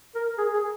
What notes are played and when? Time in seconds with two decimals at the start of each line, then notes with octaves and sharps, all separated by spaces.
0.15 A#4
0.38 G#4
0.54 G#4